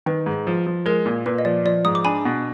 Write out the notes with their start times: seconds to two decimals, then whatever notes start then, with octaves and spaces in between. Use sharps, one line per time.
0.06 D#3 B4
0.26 G#2
0.47 F3
0.66 F3
0.86 G#3 A#4
1.06 A#2
1.26 A#2 B4
1.38 D#5
1.45 F3 D5
1.65 F3 D5
1.85 G#2 D#6
1.95 D6
2.05 D4 G#5 B5
2.25 B2